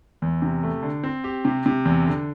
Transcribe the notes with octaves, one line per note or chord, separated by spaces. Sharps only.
E2
C3
A3
D3
C4
G4
C3
C3
E2
D3